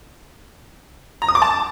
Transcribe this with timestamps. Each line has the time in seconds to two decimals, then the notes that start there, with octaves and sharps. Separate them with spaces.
1.22 A#5
1.28 D#6
1.35 D6
1.42 A5